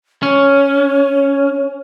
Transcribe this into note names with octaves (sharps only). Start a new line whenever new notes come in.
C#4 C#5